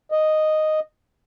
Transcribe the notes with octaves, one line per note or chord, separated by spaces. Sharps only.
D#5